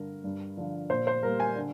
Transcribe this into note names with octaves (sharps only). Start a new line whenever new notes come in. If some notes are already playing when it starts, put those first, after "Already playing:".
Already playing: G2 D3 A#4
G2
D3 F3
A#2 C5
C5
G3 A#3 A#4
G#5
D3